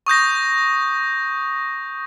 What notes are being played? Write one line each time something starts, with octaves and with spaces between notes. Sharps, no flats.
C#6 D#6 G6 A#6